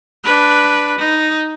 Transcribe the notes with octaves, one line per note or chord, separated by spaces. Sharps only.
D4 B4
D#4